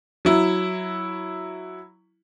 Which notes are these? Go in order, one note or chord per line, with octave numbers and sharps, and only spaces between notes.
F#3 E4